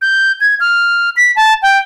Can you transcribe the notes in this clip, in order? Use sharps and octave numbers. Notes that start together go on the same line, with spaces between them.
G6
G#6
F6
B6
A5
G5